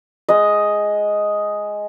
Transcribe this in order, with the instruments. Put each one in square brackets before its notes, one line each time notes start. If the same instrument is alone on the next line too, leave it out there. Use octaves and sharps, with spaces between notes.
[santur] G#3 D#5